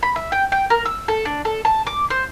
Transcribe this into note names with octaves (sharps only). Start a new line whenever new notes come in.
B5
E5
G5
G5
A#4
E6
A4
D4
A4
A5
D6
C5